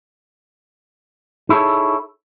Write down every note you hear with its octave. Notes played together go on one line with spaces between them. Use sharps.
D#4 E4 G#4 A4 C#5